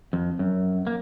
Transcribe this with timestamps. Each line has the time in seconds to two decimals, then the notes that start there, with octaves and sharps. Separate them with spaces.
0.13 F2
0.39 F#2
0.87 A#3